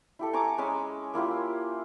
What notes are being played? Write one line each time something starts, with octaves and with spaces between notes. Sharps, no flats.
E4 G4 A4
G#5 A#5 C#6 D6
G#3 C#4 B5 D6
A#3 E4 F4 G4